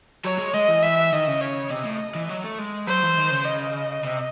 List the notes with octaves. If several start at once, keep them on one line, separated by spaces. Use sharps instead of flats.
F#3 C#5
G#3
G#3 D#5
E3
E5
D#3 D#5
C#3
C#5
C3 D#5
A2
E3
F#3
A3
G#3
F#3 C5
E3
D#3
C#3
D#5
C3